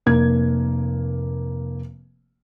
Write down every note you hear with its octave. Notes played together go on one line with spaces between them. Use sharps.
F1 A#3 G#6